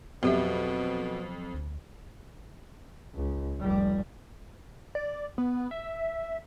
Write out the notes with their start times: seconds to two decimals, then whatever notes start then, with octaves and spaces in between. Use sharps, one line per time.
0.23 F2 B2 F#3 B3 G4 E5
1.54 D2
3.14 C#2
3.61 F1 G3
4.95 D5
5.38 B3
5.71 E5